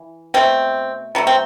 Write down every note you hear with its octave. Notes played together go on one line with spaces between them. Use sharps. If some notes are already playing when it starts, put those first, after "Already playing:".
Already playing: E3
B2 A3 C4
B2 F#3 A3
C4